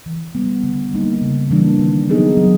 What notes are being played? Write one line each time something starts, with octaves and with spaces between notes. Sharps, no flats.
E3
G3 B3
D3
G3 A#3 D#4
C#3
E3 G3 A#3 D4
D#3
F#3 B3 D#4 G#4
F#3